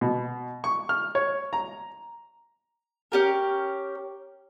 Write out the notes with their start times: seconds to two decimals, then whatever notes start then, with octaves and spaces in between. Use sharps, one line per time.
0.01 B2
0.64 C#6
0.89 F6
1.15 C#5
1.53 A#5
3.12 C#4 G4 A#4